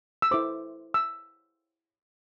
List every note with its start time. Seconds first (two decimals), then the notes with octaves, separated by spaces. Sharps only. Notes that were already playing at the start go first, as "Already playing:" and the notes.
0.22 E6
0.31 E4 A4 C5 D6
0.94 E6